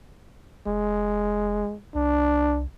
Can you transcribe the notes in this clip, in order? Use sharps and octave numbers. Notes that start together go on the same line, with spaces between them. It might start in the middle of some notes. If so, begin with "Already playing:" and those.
F1 G#3
C2 D4